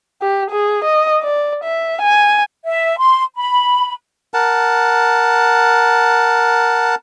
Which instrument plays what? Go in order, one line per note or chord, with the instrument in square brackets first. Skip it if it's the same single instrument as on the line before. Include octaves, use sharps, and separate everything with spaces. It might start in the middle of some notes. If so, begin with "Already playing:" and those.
[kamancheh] G4
G#4
D#5
D5
E5
G#5
[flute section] E5
C6
B5
[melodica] A#4 F#5 A5